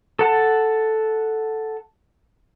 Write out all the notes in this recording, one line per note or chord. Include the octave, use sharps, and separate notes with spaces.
A4 F#5 A5